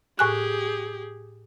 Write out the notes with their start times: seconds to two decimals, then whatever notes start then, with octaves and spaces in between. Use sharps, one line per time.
0.19 A2 G4 G#4 G#5 F#6